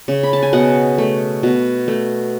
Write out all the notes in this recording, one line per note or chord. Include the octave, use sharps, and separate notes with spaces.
C#3
B5
A5
G#5
B2 D#5 F#5
A3
B2
A3